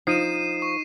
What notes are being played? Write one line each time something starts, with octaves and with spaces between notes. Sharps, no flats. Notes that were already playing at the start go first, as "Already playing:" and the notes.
F3 D#4 C7 D#7 E7
C#6